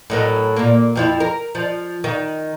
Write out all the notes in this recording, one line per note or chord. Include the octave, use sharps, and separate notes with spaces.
A2 F#3 A#4
A#2 A#3
F2 F3 E4
A#4
F3
D#3